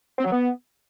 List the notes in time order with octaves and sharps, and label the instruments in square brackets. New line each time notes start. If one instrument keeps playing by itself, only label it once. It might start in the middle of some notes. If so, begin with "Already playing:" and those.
[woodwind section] C4
F#3
B3